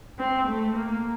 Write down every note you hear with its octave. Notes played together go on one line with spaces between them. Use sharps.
C4
A3
A#3